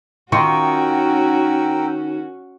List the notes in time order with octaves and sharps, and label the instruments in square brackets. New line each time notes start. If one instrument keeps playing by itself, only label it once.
[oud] D#3 F4 [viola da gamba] C#4 F#4 [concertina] A#4 G5 E6 [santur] C#6